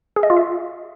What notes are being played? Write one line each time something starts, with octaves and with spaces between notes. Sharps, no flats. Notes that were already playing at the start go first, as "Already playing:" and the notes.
G#4
D#5
F4
E5